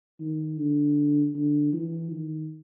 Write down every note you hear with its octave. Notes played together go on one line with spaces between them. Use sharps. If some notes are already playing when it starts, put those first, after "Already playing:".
D#3
D3
D3
E3
D#3